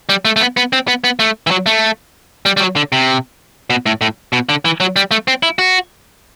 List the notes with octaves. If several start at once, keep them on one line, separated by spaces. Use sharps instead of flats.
G3
A3
A3
B3
B3
C4
B3
B3
A3
E3
F#3
A3
G3
G3
F#3
D3
C3
B2
A2
A2
B2
D3
E3
F#3
G3
A3
C4
E4
F#4